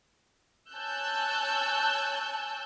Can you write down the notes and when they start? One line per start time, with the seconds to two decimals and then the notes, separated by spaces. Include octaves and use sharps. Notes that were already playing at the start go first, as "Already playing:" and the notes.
0.71 C#5 G#5 A5 E6 F#6 G6